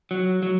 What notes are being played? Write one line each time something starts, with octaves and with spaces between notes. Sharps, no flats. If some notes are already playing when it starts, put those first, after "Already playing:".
F#3
F#3